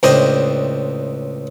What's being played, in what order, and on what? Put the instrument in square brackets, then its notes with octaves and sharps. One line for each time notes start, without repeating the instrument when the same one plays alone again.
[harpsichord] C#2 A2 D4 C5 D#5 G5